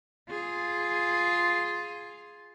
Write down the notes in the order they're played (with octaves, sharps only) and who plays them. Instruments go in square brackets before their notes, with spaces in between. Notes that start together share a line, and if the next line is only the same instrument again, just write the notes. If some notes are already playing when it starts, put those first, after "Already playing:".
[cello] F4 G#4